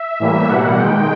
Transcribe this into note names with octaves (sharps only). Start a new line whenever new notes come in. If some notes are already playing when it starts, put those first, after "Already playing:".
Already playing: E5
A2 E3 G3 A#3
B2 G3 A#3 F#5
D#3 G#3 G5